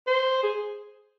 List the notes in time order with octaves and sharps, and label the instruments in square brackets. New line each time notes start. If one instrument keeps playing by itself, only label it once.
[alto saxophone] C5
G#4